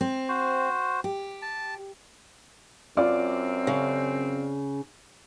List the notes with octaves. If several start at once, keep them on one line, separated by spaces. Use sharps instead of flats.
C4
F#4 C5
G4
A5
F#2 C4 F4 D5 D6
C#3